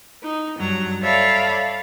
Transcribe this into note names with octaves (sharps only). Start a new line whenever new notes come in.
D#4
G2 F#3 A#5
A4 C#5 D5 E5 F5 B5